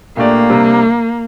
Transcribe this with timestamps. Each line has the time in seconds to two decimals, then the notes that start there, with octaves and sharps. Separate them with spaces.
0.17 A#2 A3 A#3 D4 G4 D5
0.48 C3 G3 D4